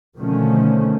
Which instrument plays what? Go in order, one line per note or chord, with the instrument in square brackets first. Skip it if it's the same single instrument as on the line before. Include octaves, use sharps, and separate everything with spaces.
[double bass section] B2 D3 D#3 F3 A3 C#4